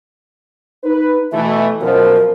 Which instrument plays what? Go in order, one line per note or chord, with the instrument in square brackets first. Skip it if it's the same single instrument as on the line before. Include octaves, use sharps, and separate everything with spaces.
[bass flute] D#4 [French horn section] B4
[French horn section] B2 E3 A3 [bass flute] E5
[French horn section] F#2 B2 F3 [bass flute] A#4